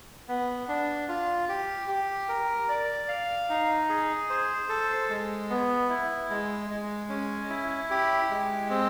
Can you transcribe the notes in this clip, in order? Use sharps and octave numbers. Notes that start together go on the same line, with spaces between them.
B3
D4
F4
G4
G4
A#4
D5
F5
D#4
G#4
C5
A4
G#3
B3
E4
G#3
G#3
C#4
E4
G4
G#3
C4